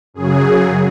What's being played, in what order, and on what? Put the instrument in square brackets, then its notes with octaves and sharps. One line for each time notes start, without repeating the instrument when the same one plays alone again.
[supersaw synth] F#2 C#3 F#3 G#4